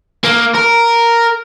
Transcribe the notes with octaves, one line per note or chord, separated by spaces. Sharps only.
A#3
A#4